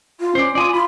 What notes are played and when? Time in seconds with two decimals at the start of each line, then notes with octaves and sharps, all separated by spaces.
0.20 F4
0.35 C#4 C5 D5
0.55 F4 D5 G#5 D#6
0.73 F4 B5